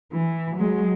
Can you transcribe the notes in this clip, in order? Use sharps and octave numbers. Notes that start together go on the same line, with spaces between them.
E3
F#3 G#3